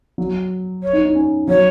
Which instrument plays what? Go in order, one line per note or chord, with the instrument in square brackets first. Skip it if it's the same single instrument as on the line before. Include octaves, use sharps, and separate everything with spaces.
[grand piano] F#3
[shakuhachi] C#5
[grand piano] D#4
D#4
C#4
[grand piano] F#3 [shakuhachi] C#5